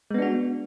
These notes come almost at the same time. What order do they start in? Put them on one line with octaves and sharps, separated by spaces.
G#3 B3 D4 F#4